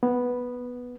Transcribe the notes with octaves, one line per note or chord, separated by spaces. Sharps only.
B3